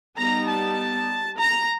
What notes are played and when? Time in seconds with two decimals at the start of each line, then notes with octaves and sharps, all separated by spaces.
0.18 G3 B3 D#4 A#5
0.48 A5
1.38 A#5